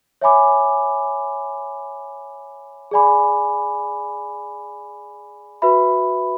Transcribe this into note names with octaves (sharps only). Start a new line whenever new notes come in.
C#5 E5 G#5 B5 D6
G#4 D5 G#5 B5 D6
F#4 B4 E5 B5